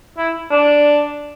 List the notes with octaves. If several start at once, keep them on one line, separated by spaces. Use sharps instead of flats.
E4
D4